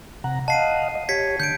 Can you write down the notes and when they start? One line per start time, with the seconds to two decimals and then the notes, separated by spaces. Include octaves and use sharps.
0.24 C3 F#5 A#5
0.48 D#5 F5 F#5 A5 C7 D#7
0.95 D#5
1.09 G4 C#5 G#6 B6 C#7
1.40 D3 G6 C#7 D7